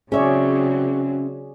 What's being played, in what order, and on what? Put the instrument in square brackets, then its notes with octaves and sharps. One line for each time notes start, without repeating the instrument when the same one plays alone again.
[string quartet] C#3 F#3 C4 [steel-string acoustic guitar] C#4 E5 [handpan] G#4 C#5 D5